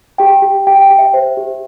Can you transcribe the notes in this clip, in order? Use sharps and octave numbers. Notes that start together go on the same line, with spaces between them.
G4 G5
G4
G4 G5
G5
G4
E5
C5
G4